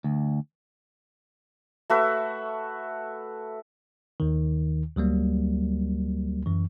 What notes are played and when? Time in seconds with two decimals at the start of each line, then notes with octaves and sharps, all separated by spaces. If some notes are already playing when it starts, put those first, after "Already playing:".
0.04 D2
1.90 A3 F#4 B4 E5
4.20 D#2 D#3
4.96 D2 F#3 G3 A#3
6.46 F#2 E3